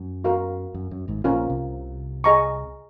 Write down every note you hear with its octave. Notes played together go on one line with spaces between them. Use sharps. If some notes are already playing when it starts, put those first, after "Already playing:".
Already playing: F#2
F#4 A#4 F5
F#2
F#2
G#1 G#2
A#1 A#2 C#4 F4 A#4
C2 C3
G#4 D#5 A#5 C#6